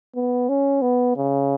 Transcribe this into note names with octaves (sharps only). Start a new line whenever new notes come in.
B3
C#4
B3
C#3